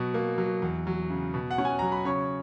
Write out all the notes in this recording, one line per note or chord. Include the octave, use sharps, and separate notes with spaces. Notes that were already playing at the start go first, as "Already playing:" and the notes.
Already playing: B2 F#3
A#3
F#3
E2
F#3
C#3
B2
F#5
C#4
G#5
F#3 A#5
B5
C#3 C#5 C#6